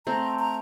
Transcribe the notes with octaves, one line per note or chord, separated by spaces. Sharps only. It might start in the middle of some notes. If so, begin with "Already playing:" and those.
A3 C4 A#5
A#5